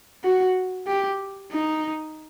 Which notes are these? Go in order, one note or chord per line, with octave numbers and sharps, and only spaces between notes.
F#4
G4
D#4